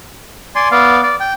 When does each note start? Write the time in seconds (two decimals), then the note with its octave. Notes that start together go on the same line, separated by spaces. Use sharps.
0.55 D5 G#5 C6
0.71 B3 D5 F5
1.03 D5
1.20 G5